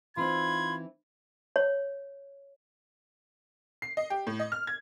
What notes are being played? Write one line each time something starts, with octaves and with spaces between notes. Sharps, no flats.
E3 C4 D#4 F4 B5 G#6
C#5
C7
D#5
G4
A2
D#5
F6
G#6